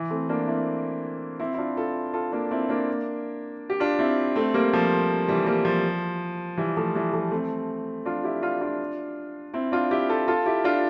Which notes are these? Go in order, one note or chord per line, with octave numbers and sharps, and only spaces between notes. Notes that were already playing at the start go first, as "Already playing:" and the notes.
Already playing: E3
A3 C4
A#3 D4
C4 E4
C4 E4
E4
D4 F4
F4 A4
F4 A4
A#3 D4
C4 E4
A#3 D4
G4
D4 F4
C4 E4
A3 C4
G3 A#3
F3
E3 G3
G3 A#3
F3
E3 G3
F3 A3
E3 G3
F3 A3
A3 C4
D4 F4
E4 G4
D4 F4
D4 F4
C4 E4
D4 F4
E4 G4
F4 A4
F4 A4
E4 G4
D4 F4